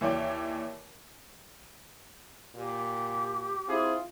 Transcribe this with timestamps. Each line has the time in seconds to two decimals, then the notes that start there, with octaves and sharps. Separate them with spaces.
0.01 D#2 E3 C#5 D5 G5
2.55 A#2 G4
3.68 C4 E4 F4 G#4